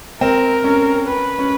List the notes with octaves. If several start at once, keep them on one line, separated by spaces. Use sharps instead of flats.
C4 A#4
C#4
B4
C#4